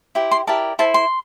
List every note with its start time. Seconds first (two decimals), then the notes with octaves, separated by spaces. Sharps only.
0.15 E4 G4 C5
0.31 C6
0.47 E4 G4 A#4 D5 A5
0.79 E4 A4 C5 A5
0.94 C6